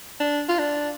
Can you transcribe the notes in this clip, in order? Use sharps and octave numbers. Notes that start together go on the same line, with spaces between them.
D4
F4
D4